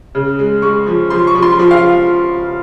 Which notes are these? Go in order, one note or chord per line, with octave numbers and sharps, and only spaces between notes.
C#3
G#3
G#3 C#6
F3
F3 C6
C#6
F3
C6
F3
F5